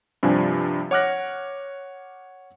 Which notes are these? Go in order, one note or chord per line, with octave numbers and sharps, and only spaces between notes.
G2 C3 F3 D4 G#5
C#5 F#5 D6 F6 F#6 A#6